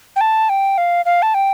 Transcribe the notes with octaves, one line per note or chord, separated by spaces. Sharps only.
G5
A5
G5
F5
F5
A5
G5